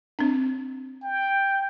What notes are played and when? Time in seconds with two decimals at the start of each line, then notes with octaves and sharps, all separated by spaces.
0.19 C4 D4
1.03 G5